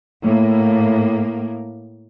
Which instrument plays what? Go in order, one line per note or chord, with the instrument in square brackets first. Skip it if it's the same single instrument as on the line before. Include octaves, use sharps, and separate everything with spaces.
[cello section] A2 A#3